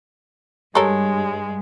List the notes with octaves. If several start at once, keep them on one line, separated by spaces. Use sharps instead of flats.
G2 G#3 G4 A4 A#4 C#5